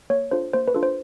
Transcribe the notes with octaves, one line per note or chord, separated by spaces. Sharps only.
A#3 C#5
D4 F4 A4 C5
A#3 C5
B4
D4 F4 A4
C5